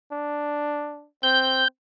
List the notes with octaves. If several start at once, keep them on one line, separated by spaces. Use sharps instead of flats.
D4
C4 G6